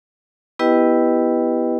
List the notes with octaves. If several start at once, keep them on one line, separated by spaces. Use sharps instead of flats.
B3 E4 G4 B4 D#5 G5